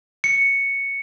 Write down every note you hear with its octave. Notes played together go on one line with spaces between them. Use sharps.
C#7